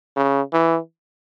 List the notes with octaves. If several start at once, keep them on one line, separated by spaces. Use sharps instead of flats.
C#3
E3